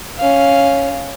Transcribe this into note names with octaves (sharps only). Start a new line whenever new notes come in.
C#4 F5